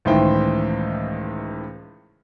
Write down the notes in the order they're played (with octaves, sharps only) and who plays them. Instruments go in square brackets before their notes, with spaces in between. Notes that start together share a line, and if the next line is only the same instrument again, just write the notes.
[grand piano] C#2 A2 D#3 E3 C5 G5